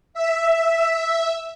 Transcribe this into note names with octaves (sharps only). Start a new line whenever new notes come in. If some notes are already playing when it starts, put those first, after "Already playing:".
E5